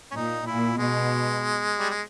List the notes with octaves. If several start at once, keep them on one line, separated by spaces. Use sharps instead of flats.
C#4
A#2 D#4
A#2 E4
B2 G#3
G3
G#3